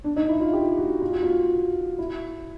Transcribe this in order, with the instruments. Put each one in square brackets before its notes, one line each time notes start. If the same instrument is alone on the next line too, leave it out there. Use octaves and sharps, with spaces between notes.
[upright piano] D4
D#4
E4
F4
G4
F#4
F4
F#4
F4
E4